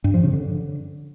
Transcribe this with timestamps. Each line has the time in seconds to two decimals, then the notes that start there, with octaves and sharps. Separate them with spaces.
0.04 G2
0.14 F3
0.24 C#3
0.33 D3